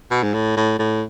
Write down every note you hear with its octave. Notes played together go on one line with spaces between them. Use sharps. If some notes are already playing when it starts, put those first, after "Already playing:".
B2
G#2
A2
A2
A2